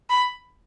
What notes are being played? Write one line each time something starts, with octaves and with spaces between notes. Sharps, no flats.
B5